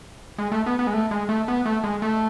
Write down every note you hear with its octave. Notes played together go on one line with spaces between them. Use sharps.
G#3
A3
B3
B3
G#3
A3
G#3
A3
B3
A3
G#3
A3